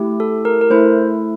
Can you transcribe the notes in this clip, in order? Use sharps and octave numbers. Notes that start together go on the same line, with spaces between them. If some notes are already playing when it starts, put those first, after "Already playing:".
Already playing: A3 E4 G4
A4
A#4
A#4
A3 E4 A4 C5